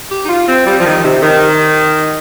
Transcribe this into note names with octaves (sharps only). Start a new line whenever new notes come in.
G4
D#4
F4
C4
G3
F3
D#3
C3
D#3